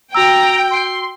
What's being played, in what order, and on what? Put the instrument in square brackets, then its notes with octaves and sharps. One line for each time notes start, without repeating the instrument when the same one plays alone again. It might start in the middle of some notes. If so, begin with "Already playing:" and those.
[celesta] F#4 E6 [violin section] G5 [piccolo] A#5
[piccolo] C6